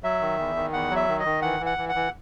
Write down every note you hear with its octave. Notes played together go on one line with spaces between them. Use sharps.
F#3 E5
D#3
E2
D#3
E2 F#5
F#3
E5
D#3
D#5
D#3
E3 F#5
E3
F#5
E3
F#5
E3